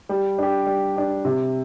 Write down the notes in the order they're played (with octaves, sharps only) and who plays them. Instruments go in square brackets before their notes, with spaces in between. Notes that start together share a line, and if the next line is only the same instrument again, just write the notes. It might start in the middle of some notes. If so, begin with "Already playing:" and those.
[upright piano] G3
D4 G4
G3
D4 G4
C3